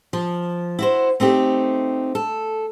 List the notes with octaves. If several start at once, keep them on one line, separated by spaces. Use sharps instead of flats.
F3
E4 F#4 C5
A3 C4 D#4 G4
A4